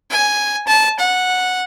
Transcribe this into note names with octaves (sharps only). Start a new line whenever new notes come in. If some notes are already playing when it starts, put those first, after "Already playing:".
G#5
A5
F#5